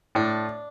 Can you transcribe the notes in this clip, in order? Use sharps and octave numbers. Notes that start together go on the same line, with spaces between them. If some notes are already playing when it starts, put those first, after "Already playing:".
A2 D4